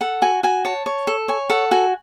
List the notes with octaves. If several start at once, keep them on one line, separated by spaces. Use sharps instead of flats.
A4 F#5
F#4 G#5
F#4 G#5
C#5 A5
C#5
A4
C#5 G#5
A4 F#5
F#4 G#5